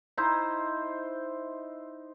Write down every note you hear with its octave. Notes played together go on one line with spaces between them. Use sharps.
D#4 E4 C5